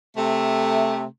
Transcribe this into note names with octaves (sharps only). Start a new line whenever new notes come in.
C3 A3